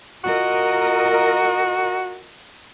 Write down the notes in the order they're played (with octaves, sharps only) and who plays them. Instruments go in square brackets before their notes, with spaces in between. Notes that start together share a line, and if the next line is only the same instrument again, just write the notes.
[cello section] F4 A#4 D#5 [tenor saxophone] F#4